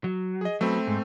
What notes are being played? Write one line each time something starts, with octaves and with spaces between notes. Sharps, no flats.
F#3
G#4 D#5
F#3 A3 B3 C4
G#2